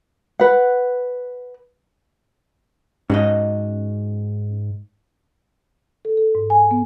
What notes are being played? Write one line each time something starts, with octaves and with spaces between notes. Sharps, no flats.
B4 F#5
G#2 C#4 F#4 D#5
A4
A4
G#2
G#5
B3